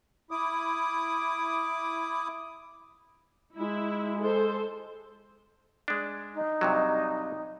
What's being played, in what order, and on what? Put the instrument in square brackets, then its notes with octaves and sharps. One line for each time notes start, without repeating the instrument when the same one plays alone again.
[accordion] E4 D6 D#6
[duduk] G#3 [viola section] E4
[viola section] A4 C5
[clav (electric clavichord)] G#3 D4
[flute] D#4
[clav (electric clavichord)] G2 C3 F#3